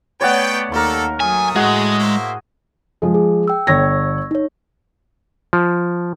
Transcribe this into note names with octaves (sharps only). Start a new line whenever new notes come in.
A3 B3 C#5 D5 F#5 G5
D#2 G3 A4 A#4 C#6
F#3 A3 G#5 D#6
A2 G#3 F#4 G#4 G#5
A#3 C5 E5
F3 G#3
G#4
G5 E6
G1 C#5 C#6 E6 G#6 A#6
D#4 C#5
F3